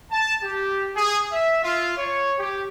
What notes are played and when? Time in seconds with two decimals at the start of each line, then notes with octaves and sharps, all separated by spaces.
0.11 A5
0.43 G4
0.96 G#4
1.32 E5
1.63 F4
1.97 C#5
2.39 G4